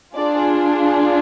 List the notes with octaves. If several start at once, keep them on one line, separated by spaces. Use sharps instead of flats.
D4 F4 G#4 D5